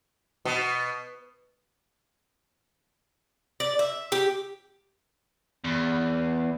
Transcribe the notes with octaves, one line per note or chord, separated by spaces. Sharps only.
B2
D5
E5
G4
E2